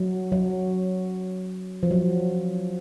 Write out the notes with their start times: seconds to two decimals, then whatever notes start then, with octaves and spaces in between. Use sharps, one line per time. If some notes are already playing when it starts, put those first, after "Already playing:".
Already playing: F#3
0.32 F#3
1.83 F3
1.91 F#3